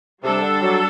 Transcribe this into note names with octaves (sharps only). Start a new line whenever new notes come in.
C3 G3 D4 A4
D3
F#3